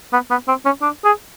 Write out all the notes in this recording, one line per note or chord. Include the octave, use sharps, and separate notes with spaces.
B3
B3
C4
C#4
D4
G#4